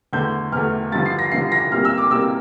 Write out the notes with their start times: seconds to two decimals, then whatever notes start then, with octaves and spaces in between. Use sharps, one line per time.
0.13 E2 D3 A3 G6
0.52 E2 D3 A3 F6
0.92 G2 D3 F3 A6
1.06 C7
1.19 A#6
1.32 G2 D3 F3 C7
1.52 A#6
1.72 A#2 G3 C4 F6
1.85 E6
1.98 D6
2.11 A#2 G3 C4 E6